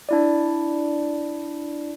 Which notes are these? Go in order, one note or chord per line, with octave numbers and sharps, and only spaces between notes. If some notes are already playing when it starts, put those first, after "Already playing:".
D4 E4 D5